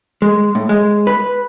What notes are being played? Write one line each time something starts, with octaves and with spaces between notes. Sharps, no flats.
G#3
A2
G#3
B4